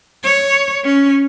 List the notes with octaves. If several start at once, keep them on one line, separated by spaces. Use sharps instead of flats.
C#5
C#4